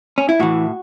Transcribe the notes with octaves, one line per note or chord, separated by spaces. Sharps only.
C#4
E4
A2 E3 F#4